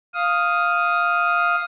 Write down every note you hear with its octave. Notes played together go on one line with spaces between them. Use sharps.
F5 D#6